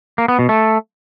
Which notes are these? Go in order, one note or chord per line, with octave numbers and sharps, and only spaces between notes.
A#3
B3
B2
A3